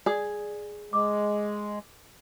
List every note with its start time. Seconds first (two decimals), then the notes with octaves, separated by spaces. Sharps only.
0.06 G#4 D5 D#6
0.93 G#3 D6